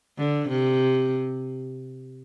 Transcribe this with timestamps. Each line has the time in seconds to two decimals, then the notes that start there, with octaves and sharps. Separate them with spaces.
0.18 D3
0.49 C3